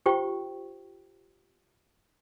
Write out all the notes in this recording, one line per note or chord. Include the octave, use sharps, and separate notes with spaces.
F4 G4 C5 G5 C#6